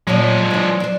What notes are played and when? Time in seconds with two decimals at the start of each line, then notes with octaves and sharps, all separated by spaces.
0.07 A#2 F3 F#3 G#3 C#4 D5
0.51 E3 D4
0.80 D4 C5